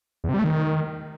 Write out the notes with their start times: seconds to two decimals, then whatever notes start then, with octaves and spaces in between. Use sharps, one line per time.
0.24 E2
0.29 C3
0.34 G3
0.39 A3
0.44 D#3